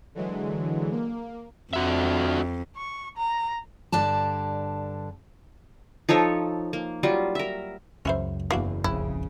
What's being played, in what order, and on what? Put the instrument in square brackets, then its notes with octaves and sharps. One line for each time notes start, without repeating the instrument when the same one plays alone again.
[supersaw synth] D3 E3 F#3 G#3
A#3
[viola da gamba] F2 [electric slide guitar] D4 F#4 E5
[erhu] C#6
A#5
[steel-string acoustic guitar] G2 D3 D5 A5
[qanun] F3 D#4 A4 C#5
A#3
F#3 G3 F4
A#4 E5
[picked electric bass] C#2 F#2 [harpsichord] C#4 E4 C5
[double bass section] F#1 E2 [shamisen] E3 [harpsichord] D4 F#4 F5
[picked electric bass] D1 A1 F2 [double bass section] C#3 [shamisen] E4